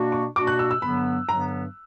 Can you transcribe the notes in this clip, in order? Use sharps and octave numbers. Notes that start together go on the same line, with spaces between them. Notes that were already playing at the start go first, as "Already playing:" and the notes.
Already playing: B2 A#3 D4 F#4
C#6
B2 A#3 D4 F#4 D6
F#6
E6
E6
G2 D3 F#3 B3 B5
G2 D3 F#3 B3 A#5